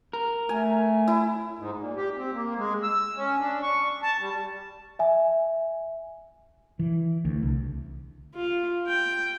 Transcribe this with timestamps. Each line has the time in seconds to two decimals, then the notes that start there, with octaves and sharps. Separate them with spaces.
0.13 A#4
0.49 A3 G#5
1.08 E4
1.58 G#2
1.78 A#2
1.96 G4
2.17 C4
2.33 A#3
2.57 G#3
2.83 E6
3.17 C#4
3.40 D4
3.62 C#6
4.02 A5
4.19 G3
4.99 E5 G#5
6.79 E3
7.25 D2
7.43 C2
8.34 F4
8.87 G5